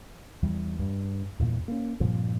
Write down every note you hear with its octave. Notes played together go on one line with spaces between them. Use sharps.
E2 E3 G3
G2
E2 G2 A#2 E3
A#3 C#4
G2 A#2 F3 C4